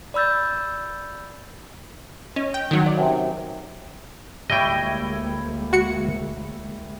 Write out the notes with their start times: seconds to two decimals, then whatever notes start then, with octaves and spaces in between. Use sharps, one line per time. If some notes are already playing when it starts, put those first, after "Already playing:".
0.14 D5 B5 E6 G6 A6
2.36 C#4 D#5
2.54 G5
2.71 D#3 F#3
2.86 D5
2.98 F#2 C3
4.50 D2 G3 G#3 A#3 E4 C#5 D#5 G5
5.73 F#4 C#7